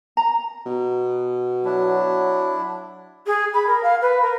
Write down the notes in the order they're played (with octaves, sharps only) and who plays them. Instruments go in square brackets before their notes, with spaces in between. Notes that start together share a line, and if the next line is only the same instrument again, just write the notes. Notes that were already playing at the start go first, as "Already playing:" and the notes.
[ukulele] A#5
[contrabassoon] B2
[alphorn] F#3 [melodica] D4 E4
[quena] G#4
B5
A#4
F5
B4
A#4